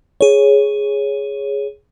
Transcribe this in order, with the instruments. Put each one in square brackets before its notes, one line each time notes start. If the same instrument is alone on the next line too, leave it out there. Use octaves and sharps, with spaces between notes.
[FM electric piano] G#4 C#5